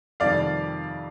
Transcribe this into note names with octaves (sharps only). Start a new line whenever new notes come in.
F2 C3 D#3 G3 D5 F5